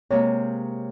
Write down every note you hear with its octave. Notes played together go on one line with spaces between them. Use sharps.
C3 G#3 A#3 C#5